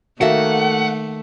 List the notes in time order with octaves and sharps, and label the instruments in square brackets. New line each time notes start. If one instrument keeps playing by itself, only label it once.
[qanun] D#3 A#3 [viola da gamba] A3 [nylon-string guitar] F#4 A4 E5 [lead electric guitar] F#5